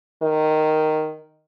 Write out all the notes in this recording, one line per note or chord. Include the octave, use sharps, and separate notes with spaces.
D#3